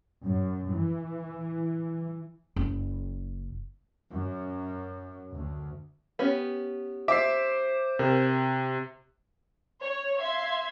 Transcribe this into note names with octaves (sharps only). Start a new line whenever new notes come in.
F#2
E3
F#1
F#2
D2
B3 C#4 G4
C5 E5 D6 C7
C3 A#4
C#5
E5 F5 C6 G#6